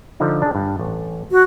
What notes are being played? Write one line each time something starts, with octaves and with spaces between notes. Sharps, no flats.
D3 F3 D#4
D4 G#4
G2
A1
F#4